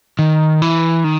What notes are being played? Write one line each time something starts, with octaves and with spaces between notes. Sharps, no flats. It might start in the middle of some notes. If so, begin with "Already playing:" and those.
D#3
E3
D#3